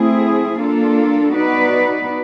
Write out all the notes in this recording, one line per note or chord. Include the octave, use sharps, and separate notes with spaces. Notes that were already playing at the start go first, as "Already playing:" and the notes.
Already playing: A3 C4 E4 G#4
A#3 D4 F4 A4
B3 D#4 F#4 B4 D5